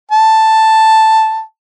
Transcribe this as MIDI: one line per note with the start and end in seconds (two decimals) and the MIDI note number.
0.11 1.42 81